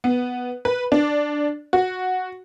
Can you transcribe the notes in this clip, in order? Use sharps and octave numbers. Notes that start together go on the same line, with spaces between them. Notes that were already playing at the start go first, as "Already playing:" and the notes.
B3
B4
D4
F#4